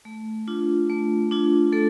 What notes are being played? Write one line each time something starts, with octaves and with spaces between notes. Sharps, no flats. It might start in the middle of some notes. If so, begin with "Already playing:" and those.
A3
D4 F4
A3
D4 F4
A3 A4